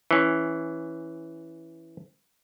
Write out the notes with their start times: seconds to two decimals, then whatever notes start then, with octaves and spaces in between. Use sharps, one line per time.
0.11 E3 C#4